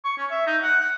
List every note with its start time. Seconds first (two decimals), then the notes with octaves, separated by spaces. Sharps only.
0.04 C#6
0.17 C#4
0.30 E5
0.46 D#4
0.62 F#5
0.81 F#5